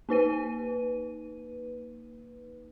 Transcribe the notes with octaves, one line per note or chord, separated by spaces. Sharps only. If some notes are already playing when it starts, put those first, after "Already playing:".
A#3 D#4 B4 D#7